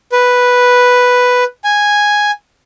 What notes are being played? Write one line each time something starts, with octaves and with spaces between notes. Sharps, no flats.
B4
G#5